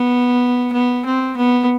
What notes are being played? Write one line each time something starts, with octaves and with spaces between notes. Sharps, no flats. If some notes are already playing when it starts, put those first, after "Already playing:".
Already playing: B3
B3
C4
B3